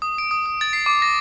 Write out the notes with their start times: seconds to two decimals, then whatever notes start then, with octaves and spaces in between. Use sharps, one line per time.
0.02 D#6
0.18 D7
0.31 D#6
0.46 D#6
0.61 A6
0.73 C7
0.86 D6
1.02 A#6